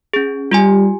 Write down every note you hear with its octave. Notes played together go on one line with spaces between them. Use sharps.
C#4 G#4
G3 F4 G4 G#5